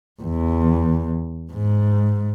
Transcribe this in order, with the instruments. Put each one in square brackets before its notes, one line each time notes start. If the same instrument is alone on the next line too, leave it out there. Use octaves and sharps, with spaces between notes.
[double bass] E2
G#2